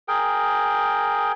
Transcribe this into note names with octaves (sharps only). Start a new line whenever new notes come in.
G#4 A#4 G5